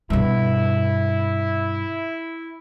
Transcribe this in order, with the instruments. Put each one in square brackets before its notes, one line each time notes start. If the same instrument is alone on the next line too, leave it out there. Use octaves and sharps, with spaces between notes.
[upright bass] G2 B2 [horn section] E4